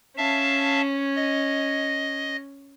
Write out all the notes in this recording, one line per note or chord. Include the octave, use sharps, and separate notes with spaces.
C#4 E5 F5 A5
D#5